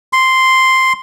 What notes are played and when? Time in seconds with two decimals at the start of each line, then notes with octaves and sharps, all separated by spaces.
0.13 C6